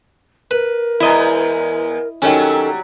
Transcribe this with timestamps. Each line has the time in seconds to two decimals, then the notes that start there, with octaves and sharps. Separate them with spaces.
0.51 A#4 B4
1.00 E2 G#3 E4 D#5
2.22 D#3 F#3 G3 C#4 A4